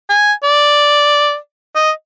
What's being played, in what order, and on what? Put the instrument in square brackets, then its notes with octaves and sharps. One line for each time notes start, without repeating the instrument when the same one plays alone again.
[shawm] G#5
D5
D#5